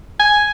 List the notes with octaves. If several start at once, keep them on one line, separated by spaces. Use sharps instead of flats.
G#5